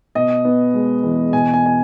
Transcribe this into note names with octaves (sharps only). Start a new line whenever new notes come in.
B2 D#5
B3
G#3
E2
B2 G#5
G#5
G#5